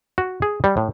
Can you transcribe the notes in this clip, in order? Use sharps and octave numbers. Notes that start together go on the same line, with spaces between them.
F#4
G#4
G3
A2